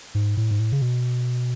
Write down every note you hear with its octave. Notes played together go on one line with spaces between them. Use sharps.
G#2
A2
G#2
A2
C#3
B2